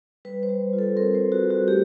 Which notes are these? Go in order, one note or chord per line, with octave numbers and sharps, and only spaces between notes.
G3 B4
C5
G3
F4
A4
C4 A#4
C5
G3
F#4
G3
F#4
A3 G4